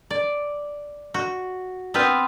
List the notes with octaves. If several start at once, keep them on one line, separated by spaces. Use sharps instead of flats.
D5
F#4
B3 C4 F4 B4 C5